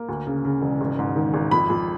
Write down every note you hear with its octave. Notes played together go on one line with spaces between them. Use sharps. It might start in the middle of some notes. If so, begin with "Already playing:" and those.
Already playing: A#3
D2
C#3
C#3
E1
G#1
G#2
D#3
G#1
F2 B5
F2